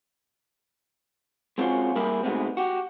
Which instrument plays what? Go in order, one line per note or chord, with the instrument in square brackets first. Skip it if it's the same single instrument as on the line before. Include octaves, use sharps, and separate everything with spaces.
[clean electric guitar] G#3 C4 C#4 F4 F#4
G3 A#3 E4 G4 G#4
G#2 B2 G#3 A3 B3 C4
F#4 G4